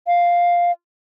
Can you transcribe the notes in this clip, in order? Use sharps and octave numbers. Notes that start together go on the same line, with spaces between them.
F5